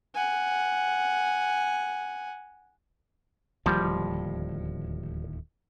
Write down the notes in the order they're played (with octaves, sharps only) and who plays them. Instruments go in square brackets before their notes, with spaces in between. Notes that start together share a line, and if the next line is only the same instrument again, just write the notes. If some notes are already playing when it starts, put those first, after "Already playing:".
[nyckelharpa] F#5 G#5
[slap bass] D1 D#2 A2 [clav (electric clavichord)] F3 G3